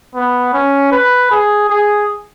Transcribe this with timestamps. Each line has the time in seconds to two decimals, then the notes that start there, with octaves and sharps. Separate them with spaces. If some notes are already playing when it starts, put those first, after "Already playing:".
0.15 B3
0.53 C#4
0.92 B4
1.31 G#4
1.69 G#4